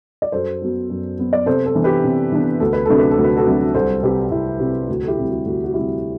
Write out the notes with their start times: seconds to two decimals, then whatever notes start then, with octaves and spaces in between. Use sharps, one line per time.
0.22 D5
0.32 F#2 A4 C5
0.62 F#3 B3
0.90 F#2
1.18 F#3 B3
1.33 D5
1.46 C3 A4 C5
1.66 A4 C5
1.75 E3 B3 D4
1.84 G4 B4
2.04 C3
2.32 E3 B3 D4
2.60 D2 A4
2.73 B4
2.86 C3 F#3 A3 D4 A4
2.99 B4
3.11 A4
3.18 D2
3.24 B4
3.37 F#4 A4
3.46 C3 F#3 A3 D4
3.74 C2 A4 C5
4.02 C3 G3 G4 B4
4.31 C2 E4
4.60 C3 G3
4.88 D2 F#4
5.03 A4
5.08 E4 G4
5.17 C3 G3
5.26 F#4
5.46 D2 F#4
5.64 F#4
5.74 C3 G3 E4 G4